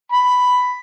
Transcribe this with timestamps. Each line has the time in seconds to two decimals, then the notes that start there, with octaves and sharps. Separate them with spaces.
0.12 B5